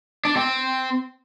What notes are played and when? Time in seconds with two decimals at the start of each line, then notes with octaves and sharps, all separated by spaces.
0.25 D4
0.36 C4